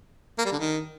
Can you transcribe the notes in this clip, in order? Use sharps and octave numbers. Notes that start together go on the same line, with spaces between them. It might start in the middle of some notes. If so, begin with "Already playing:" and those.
A#3
G3
D3
D#3